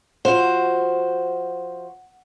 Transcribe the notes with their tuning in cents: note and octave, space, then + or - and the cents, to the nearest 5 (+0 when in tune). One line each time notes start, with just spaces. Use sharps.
F3 +0 F#4 +0 C5 +5